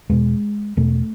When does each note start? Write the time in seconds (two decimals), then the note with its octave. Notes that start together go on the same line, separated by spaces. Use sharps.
0.09 E2 B2 G#3
0.77 E2 B2 A3